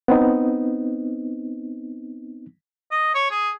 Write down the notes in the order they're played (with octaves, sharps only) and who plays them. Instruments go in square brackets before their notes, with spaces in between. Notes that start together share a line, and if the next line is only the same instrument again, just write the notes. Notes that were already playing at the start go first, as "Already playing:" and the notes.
[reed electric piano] B3 C4 D#4
[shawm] D#5
C#5
G#4